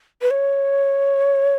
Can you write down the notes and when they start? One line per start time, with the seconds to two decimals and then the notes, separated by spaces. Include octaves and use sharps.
0.22 B4
0.31 C#5